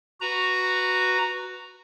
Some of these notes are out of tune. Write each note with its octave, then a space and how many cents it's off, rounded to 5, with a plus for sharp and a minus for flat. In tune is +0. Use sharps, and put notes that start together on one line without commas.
F#4 +0 B4 +0 A#5 +0